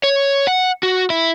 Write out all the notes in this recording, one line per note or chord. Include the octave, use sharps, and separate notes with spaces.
C#5
F#5
F#4
E4